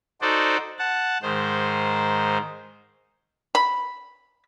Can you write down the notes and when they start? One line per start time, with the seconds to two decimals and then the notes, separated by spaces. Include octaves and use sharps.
0.22 D#4 F#4 A4 C5 D5
0.78 F#5 A5
1.22 G#2 D#3 C5
3.55 B5